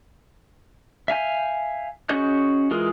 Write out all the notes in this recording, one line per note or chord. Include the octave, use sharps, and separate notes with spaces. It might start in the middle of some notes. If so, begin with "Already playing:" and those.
E5 F5 G#5 G6
C#4 F#4 G#4 D#5 G6
E3 G#3 F4 G#4 A#4